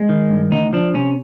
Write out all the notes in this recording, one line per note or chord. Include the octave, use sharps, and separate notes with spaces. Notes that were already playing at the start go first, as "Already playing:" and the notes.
Already playing: G#3
D#3
G2
D2 D#4
F3 D4
C3 C#4